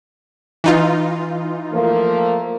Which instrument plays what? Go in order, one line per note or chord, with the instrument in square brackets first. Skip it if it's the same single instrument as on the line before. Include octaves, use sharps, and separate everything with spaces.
[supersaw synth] E3 D#4 F4
[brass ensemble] F3 A3 A#3